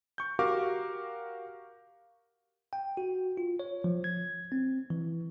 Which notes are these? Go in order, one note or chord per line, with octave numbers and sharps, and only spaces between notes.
C#6 G6
F#4 G4 A#4 F5 C#6 D6
G5
F#4
F4
C#5
F3
G#6
C4
E3